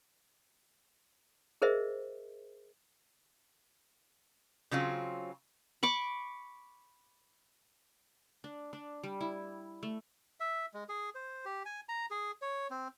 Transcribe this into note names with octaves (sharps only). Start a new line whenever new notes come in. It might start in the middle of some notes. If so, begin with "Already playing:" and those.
G#4 A#4 C5 D#5 E5
C#3 F#3 C4 F4
B5 C#6 D6
D4
D4
G3
E4
A3
E5
G#3
G#4
C5
G4
G#5
A#5
G#4
C#5
C4